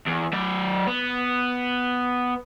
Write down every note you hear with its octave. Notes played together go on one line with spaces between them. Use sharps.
E2
F#3 D5
B3